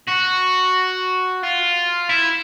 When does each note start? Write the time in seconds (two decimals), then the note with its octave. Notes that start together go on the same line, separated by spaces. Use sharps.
0.08 F#4
1.43 F4
2.10 E4